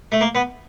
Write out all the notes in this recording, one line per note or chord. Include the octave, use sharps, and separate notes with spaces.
A3
A#3
B3